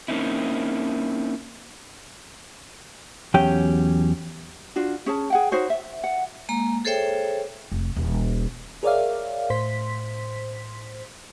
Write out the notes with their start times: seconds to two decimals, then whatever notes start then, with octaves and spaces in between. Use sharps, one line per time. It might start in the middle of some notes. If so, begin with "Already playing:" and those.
0.08 A#3 C4 C#4 D#4 E4
3.34 E2 F#3 C#4 G4 G5
4.76 D4 F4 F#4
5.06 C#4 G#4 C#5 A5
5.30 G#4 F#5 G5
5.52 D#4 F#4 C5 C#5
5.70 E5
6.04 F#5
6.49 G#3 A#3 A#5
6.85 G#4 A4 C5 C#5 E5 G5
7.72 F1
7.96 D#1
8.83 G#4 A#4 C#5 D5 E5 F5
9.50 A2 C5 C6 B6